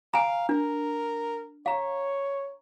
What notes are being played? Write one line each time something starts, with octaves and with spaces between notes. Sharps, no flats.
F5 G#5 A#5
D4 A#4
C#5 F5 A#5